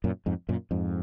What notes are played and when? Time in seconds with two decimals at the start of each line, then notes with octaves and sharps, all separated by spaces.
0.04 F#2 A#2
0.26 F2 G#2
0.49 F#2 A#2
0.71 F2 G#2